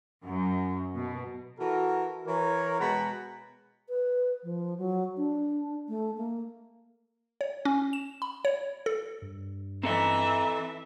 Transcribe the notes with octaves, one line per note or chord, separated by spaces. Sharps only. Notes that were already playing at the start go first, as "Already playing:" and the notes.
F#2
B2
E3 F#4 A4 A#4
E3 A#4 C#5
B2 G#3 G#4 F#5 A#5 B5
B4
F3
F#3
D4
A3
A#3
C#5
C#4
E7
B5
C#5
A4
G2
E3 C4 A4 D#5 E5 A#5